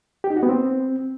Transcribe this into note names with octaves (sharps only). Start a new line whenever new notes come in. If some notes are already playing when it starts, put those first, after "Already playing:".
G4
D#4
F#4
B3
C4